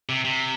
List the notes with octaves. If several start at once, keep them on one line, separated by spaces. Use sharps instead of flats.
C3
C3